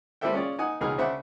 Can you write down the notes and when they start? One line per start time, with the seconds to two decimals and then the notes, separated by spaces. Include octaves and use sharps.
0.21 G3 C4 E4 A4 E5 G5
0.33 C#4 F4 G#4 D5
0.59 D#4 F#5 G#5 D#6
0.81 C#2 B2 E3 D#4 G#4 F6
0.98 C#3 D4 C5 E5 F#5